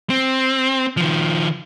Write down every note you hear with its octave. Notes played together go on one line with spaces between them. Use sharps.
C4
D#3 F3